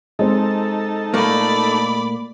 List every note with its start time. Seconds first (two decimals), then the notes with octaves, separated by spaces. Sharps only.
0.19 G#3 C4 D#4 A4
1.14 A#2 A3 A#3 D5 B5